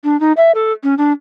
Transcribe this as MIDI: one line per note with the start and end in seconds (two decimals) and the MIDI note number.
0.04 0.19 62
0.20 0.32 63
0.37 0.52 76
0.55 0.73 69
0.83 0.95 61
0.98 1.12 62